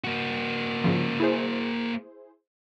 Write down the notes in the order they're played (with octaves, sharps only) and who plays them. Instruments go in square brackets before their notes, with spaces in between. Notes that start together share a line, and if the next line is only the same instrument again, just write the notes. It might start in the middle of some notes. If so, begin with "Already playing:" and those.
[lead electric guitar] A#3 F#4
[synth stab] G#2 C#3 F3
E4 G#4 C5